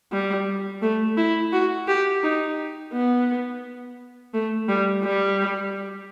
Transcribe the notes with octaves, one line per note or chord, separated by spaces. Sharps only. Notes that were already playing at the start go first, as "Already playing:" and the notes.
G3
A3
E4
F#4
G4
D#4
B3
A3
G3
G3